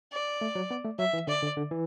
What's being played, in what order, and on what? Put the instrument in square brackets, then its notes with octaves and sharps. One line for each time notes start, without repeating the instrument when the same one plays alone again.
[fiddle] D5
[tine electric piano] A3
F#3
B3
A3
[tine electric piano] F#3 [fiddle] E5
[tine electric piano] E3
[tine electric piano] D3 [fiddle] D5
[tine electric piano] D3
D3
E3